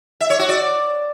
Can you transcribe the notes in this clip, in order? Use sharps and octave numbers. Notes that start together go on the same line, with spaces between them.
E5
C#5
F#4
D5